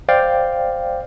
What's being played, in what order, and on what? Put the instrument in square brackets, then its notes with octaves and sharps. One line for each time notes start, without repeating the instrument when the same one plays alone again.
[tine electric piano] C5 D5 F5 G5